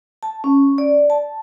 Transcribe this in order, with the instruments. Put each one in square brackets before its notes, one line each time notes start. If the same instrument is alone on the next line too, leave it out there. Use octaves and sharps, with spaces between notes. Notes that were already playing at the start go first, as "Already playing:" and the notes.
[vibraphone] A5
C#4
D5
A5